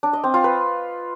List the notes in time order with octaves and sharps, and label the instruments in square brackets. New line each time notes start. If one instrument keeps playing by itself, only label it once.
[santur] D4
D#5
C4
F4
B4